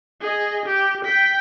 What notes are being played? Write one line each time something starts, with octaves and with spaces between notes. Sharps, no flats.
G#4 D#5
G4
G5 B6